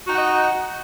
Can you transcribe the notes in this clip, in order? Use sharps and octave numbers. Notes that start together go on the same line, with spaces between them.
D#4 F#4 D#5 F#5